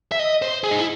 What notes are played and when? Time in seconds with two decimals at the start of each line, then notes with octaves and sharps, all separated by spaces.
0.12 E5
0.19 D#5
0.42 C5
0.64 G#4
0.71 D#4
0.79 E4